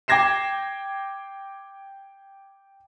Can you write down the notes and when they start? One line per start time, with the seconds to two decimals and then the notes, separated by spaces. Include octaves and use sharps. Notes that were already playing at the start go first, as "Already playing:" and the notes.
0.08 G5 D6 G#6 A#6 C7 E7